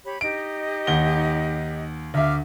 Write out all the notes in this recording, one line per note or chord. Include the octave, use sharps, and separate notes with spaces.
G4 C#5 B5
D#4 G4 D#5 D7
D#2 F#5 G7
D2 E5 F5 D6 F6